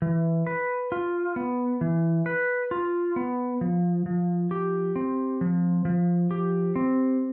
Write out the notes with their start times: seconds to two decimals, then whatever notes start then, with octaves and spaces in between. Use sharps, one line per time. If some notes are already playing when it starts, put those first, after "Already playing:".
0.02 E3
0.47 B4
0.92 F4
1.36 B3
1.81 E3
2.26 B4
2.71 F4
3.16 B3
3.61 F3
4.06 F3
4.51 G4
4.96 C4
5.41 F3
5.85 F3
6.31 G4
6.76 C4